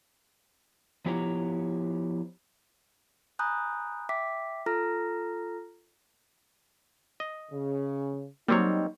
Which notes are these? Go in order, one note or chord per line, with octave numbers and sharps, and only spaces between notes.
F3 B3 E4 G4 C#5 A#5
G#5 A#5 B5 D#6 F#6 G6
E5 G5 D6 B6
F4 A4 A#5 F6 A#6
D#5
C#3
F#3 G3 A#3 C4 D#4 C#5